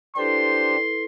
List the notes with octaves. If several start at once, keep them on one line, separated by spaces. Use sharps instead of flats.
D4 E4 G4 A4 B4 C5 C6